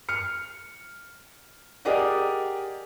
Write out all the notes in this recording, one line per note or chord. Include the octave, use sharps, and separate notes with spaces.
F6 C#7
G4 G#4 A#4 D5 D#5 F#5